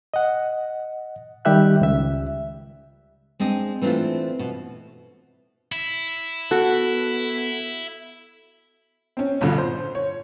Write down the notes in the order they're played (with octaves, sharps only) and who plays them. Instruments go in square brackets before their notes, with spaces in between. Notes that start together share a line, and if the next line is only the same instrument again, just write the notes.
[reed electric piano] D#5 F#5
D#3 G3 G4 E5 F#6
C#2 E5
[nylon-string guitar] G#3 C4 D4 D#5
E3 A3 C4 D4 E4 F4
B2
[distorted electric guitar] E4
[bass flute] B3 [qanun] F#4 [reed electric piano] A4
[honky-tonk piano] C4 C#4
A#1 G2 B2 D3 F3
C5
C#5